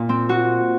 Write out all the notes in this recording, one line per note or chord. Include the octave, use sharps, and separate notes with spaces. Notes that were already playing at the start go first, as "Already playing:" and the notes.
Already playing: A#2
C4
F#4